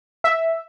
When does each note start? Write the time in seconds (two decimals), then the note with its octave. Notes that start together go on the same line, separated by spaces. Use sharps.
0.24 E5